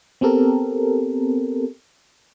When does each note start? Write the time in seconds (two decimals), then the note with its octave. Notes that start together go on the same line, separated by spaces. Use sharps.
0.21 B3 C4 G4 A4 A#4